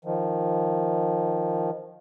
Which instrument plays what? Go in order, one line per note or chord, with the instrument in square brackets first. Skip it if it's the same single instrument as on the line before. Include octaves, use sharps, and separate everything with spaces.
[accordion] D#3 F3